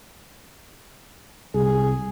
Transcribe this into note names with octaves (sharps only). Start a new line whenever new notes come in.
C2 G#4